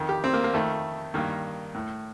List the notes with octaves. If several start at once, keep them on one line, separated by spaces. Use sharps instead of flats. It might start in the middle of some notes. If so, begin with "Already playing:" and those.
Already playing: F2 D#3
G4
C4
A#3
A#3
F2 D#3 A3
G2 D#3 A#3
A2